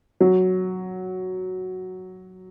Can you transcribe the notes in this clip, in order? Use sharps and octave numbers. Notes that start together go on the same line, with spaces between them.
F#3